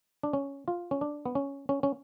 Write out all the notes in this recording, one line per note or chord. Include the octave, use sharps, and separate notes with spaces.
D4
C#4
F4
C#4
D4
B3
C#4
C#4
C#4